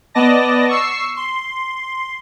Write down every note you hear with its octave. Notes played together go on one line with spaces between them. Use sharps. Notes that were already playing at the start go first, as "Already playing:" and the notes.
B3 D5 D#5 A5 A#6
C#6 E6 C7
C6